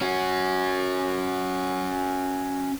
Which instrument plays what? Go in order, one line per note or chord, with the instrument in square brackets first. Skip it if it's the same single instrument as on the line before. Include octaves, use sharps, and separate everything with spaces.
[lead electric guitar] C#4 F#4